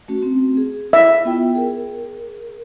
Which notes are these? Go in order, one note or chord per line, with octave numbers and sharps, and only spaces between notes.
A3 C#4 F#4
C4
G#4
E4 E5
B3 F4 G5
G#4 A#4